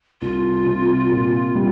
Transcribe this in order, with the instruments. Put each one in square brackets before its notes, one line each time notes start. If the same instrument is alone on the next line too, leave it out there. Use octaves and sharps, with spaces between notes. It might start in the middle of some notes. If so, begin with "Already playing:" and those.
[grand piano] C2 [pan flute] F4
[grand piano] C3
A#2
G3